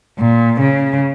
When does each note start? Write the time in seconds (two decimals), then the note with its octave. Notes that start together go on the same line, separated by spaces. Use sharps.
0.18 A#2
0.60 C#3